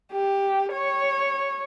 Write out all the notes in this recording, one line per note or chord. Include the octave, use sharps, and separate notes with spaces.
G4
C#5